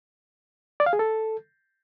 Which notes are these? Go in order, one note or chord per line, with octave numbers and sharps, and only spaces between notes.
D5
F5
G#4
A4